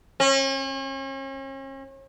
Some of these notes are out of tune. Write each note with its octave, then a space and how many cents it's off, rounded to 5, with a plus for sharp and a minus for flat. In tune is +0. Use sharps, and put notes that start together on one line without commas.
C#4 -40